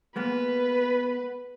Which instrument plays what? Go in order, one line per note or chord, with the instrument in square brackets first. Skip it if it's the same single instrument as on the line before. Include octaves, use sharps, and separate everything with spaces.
[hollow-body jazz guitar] G#3 A#3 B3 [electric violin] B4